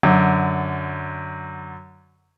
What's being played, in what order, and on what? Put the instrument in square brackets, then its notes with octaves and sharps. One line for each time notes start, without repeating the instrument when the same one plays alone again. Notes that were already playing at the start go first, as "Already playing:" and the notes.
[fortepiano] F#2 D3